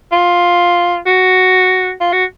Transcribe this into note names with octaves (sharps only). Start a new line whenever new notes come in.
F4
F#4
F4
F#4